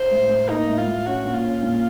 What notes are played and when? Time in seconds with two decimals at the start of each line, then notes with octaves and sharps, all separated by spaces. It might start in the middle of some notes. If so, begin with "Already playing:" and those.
Already playing: C5
0.11 A2
0.30 A2
0.49 A#3 D#4
0.68 A2
0.78 F4
0.87 A2
1.06 C#4 F#4
1.25 A#2
1.35 F4
1.44 C#4
1.63 A#2